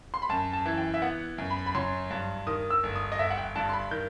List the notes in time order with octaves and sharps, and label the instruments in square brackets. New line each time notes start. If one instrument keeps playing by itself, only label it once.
[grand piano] C6
B5
F#2 A5
A5
E3
G5
E5
B3 F#5
F#2
B5
B5
F#3 C6
G2
D#3 D#6
E6
G1
D#6
D#5
G1 E5
F#5
G5
G2 A5
C6
B5
D#3 G6